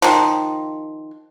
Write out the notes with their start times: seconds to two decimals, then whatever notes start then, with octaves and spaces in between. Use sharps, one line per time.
0.02 D#3 F3